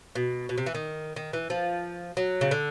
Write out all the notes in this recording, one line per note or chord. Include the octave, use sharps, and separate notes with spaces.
B2
B2
C3
E3
D#3
D#3
E3
F3
F#3
C#3
D3